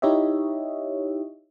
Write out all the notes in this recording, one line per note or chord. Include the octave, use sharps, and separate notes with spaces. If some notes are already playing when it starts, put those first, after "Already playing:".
D#4 E4 G4 C#5 D#5 E5